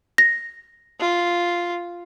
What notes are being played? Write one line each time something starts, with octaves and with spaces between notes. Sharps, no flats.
A#6
F4